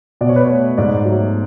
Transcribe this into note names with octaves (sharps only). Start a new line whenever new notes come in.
B2 D5
C#5
B4
A3 C#5
G#2 D5
F#3 A3